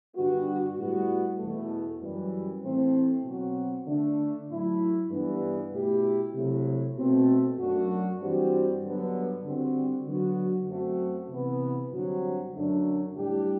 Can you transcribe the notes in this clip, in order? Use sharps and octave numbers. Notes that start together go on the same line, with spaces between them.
G2 D3 G3 B3 F#4
A2 G3 B3 F#4
E2 B2 A3
F#2 E3 G3
A2 E3 A3 C4
B2 F#3 C4 F#4
D3 A3 D4
A2 F#3 A3 E4
G2 E3 B3
B2 A3 E4 G4
C3 F#3 A3 E4
B2 A3 C4
F#2 F#3 A3 D4 F#4
G2 E3 G3 C4 F#4
G2 D3 F#3 B3
D3 G3 C4 F#4
D3 F#3 B3 F#4
F#2 F#3 A3 C4 F#4
C3 E3 B3
G2 D3 F#3 C4 F#4
F#2 D3 F#3 A3 D4
A2 G3 D4 G4